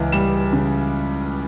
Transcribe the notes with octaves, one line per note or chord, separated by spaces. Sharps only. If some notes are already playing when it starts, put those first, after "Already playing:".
Already playing: C#2 E3
G3 E7
C#3